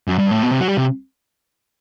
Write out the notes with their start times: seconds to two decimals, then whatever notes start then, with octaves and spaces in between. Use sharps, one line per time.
0.08 F#2
0.19 G2
0.31 A2
0.43 B2
0.51 C3
0.60 F#3
0.68 G3
0.77 C3